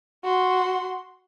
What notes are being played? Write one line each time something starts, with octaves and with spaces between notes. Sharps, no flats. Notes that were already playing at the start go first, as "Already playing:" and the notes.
F#4 C6